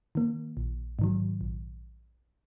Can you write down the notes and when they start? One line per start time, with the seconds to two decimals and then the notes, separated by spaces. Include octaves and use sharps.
0.15 D#3 A#3
0.57 A#1
0.99 G#2 D#3 F#3
1.41 A#1